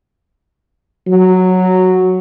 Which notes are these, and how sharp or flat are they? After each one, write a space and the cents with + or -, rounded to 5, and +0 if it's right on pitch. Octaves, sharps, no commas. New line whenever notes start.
F#3 -5